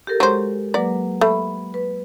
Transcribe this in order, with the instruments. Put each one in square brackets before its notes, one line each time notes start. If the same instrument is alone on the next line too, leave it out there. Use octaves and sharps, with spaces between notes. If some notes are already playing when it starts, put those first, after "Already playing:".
[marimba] G4 A4 A#4
[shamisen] F#3 C5 [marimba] G#3
[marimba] F#3 A#3 B4 [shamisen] D5
[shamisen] A3 [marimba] B5
[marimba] B4